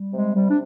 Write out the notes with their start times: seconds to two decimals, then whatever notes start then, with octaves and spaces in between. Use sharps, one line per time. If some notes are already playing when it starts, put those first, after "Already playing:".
Already playing: G3
0.13 C3 G#3
0.35 C3 G3
0.49 D4